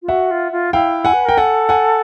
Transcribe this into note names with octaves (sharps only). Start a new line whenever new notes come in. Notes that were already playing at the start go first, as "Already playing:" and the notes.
F4
F#4 E5 F#5
F4
F4
E4 F5 G5
F#5 G#5
B4
A#4 G5
A4 F#5 G#5
F#5 G#5